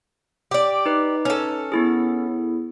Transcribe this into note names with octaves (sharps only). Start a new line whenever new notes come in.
G4 D5
D#4 B4
C#4 A4
B3 E4 G#4